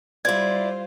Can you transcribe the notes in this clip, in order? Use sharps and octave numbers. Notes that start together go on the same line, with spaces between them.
G3 E4 F4 C5 D5 G#6